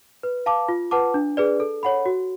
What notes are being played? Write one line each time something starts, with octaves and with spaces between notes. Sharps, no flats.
B4
F5 A5 D6
F4
B4 F#5 A5 D6
D4
G#4 B4 D5
A4
C#5 F#5 B5
F#4